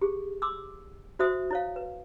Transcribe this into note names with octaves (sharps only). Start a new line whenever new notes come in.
G4 G#4
C6 D6 E6
F#4 C5 E5 D#6
E4 C#5 F5
B4